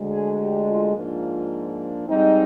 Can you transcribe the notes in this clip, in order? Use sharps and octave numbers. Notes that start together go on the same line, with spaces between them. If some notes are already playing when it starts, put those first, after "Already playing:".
Already playing: D2 D3 G#3
G#4
G4
F4
G#2 F3 A#3 D4 F4
G#2 G3 C4 D#4